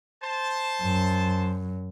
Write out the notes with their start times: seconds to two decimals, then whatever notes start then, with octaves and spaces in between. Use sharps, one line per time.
0.24 C5 A5
0.83 F#2